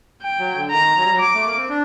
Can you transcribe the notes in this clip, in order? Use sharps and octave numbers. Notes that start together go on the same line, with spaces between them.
G5
F#3
D3
D#3 A#5
F#3
G3
F#3
D6
A3
A#3
C4
D4